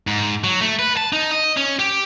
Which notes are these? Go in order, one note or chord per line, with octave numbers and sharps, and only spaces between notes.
G#2
F#3
A3
B4
A5
D#4
D#5
C#4
G4